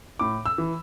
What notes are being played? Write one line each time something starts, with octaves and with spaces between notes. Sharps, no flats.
A2 D6
E6
E3